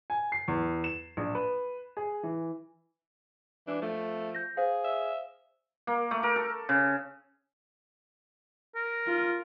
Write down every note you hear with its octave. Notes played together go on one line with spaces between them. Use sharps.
G#5
C7
E2
E7
A#1
B4
G#4
E3
E3 D4
F3 A3
G6 A#6
G#4 C5 F5
E5
A#3
A3
A#4
A4
C#3
A#4
F4